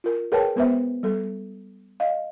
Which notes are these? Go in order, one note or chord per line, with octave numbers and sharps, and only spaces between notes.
F4 A#4
G#4 A#4 B4 C#5 G5 A5
G#3 B3 B4 C5 E5
G3 A4
D#5 F5